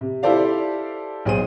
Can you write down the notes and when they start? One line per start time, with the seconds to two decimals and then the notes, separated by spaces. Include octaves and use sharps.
0.01 C3
0.23 E4 G4 A4 C5 D5 F5
1.25 B1 G#4 C5 D#7